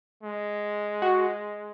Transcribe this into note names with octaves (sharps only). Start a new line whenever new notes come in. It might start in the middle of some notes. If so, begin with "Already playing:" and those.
G#3
F#4